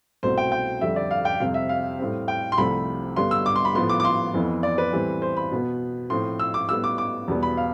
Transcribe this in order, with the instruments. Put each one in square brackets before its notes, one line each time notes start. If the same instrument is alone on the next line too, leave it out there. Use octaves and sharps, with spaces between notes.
[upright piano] C2 B2 A3 C4 C5
G5
G5
F2 D3 G3 E5
D5
F5
G5
F2 C3 G3 C4 F5
E5
F5
A2 G3 C4
G5
C6
C2 C3 F3 A3 B5
G2 D3 G3 B3 C6
E6
D6
C6
B5
A2 F3 B3 C6
D6
D6
C6
F2 E3 B3
D5
B4
A2 E3 G3 C4
C5
B5
B2 B3
A2 F3 C4 C6
E6
D6
A2 G3 B3 E6
D6
D6
E2 B2 G3 B3
B5
F5